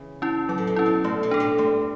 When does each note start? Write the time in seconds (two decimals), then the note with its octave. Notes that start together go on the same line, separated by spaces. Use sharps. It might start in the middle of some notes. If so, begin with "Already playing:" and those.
Already playing: C#3 E3
0.22 C#4 E4
0.49 D3 F#3
0.58 A2
0.67 B2
0.76 C#4 E4
0.86 B2
1.04 A2 A3
1.23 B2
1.31 D4 A4
1.40 A2
1.58 G2 A3